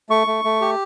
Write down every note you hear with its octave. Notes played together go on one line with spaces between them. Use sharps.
A3 C#6
A3
A3
G4